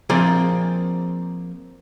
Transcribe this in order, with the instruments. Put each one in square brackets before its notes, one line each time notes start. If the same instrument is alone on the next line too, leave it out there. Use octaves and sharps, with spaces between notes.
[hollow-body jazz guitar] F3 A#3 C4 G#4 D5